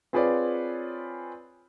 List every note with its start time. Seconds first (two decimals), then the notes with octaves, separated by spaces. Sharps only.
0.13 C4 F4 G#4 B4 C#5 D5